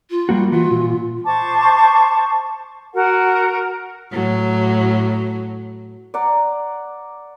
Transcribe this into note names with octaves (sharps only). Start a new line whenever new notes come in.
F4
G3 A#3 F#4
E3 F4 F#4
A#2
C5 A5 C#6 D6
F#4 A#4 F#5
A2 F#3
D5 F#5 A#5